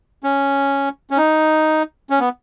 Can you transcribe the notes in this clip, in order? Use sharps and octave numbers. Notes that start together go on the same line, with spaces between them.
C#4
C#4
D#4
C#4
B3